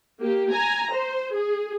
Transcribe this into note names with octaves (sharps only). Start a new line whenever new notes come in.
A#3 G4
G#5 A#5
C5
G#4